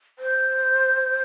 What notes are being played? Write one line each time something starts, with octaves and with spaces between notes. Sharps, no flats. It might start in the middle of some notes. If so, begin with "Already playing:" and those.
C5